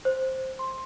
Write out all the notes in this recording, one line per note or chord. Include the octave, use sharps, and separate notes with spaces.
C5
C6